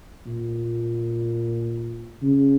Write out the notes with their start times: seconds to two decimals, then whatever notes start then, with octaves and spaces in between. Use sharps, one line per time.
0.26 A#2
2.22 C#3